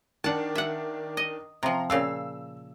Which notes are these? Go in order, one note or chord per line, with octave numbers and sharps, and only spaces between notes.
D#3 D4 F#5 A5
E5 F#5
D#5
C3 F3 A#5 C6
A#2 C#3 F5 E6